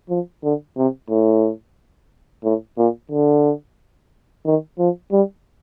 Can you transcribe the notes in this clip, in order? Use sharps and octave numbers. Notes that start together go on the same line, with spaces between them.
F3
D3
C3
A2
A2
A#2
D3
D#3
F3
G3